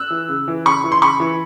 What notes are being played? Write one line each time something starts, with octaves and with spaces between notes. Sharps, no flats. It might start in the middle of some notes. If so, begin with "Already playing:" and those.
Already playing: E6 F#6
E3
C#3
E3
C#3 B5 C#6
E3
C6
C#3 B5 C#6
E3